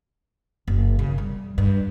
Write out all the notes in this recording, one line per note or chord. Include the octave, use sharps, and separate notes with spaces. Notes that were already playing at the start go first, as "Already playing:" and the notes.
F#1
C#3
G3
G2